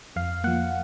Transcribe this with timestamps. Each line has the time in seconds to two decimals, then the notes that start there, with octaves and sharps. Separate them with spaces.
0.16 F2 F5
0.44 F3 A#3 F#5